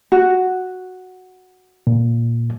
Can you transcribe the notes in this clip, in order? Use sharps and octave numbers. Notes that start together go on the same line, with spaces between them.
F#4
A#2